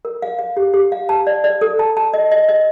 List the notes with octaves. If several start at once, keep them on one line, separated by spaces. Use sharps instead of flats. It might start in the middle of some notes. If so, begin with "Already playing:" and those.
A#4
F5
F5
G4
G4
F5
A5
D5
D5
A4
A5
A5
D#5
D#5
D#5